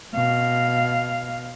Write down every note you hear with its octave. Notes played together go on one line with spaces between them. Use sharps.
B2 F5